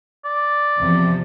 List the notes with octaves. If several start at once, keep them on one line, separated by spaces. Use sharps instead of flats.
D5
E2 C3 F3